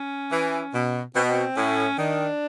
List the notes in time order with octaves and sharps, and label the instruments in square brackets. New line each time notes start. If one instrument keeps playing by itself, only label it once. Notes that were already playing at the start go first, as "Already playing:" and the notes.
Already playing: [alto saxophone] C#4
[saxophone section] E3
B2
[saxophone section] B2 [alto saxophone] C4
[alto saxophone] B3
C4
[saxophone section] A2 [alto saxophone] C#4
[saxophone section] D#3 [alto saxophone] D4